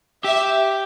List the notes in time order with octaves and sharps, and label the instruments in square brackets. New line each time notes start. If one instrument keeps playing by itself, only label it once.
[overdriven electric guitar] G4 [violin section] E5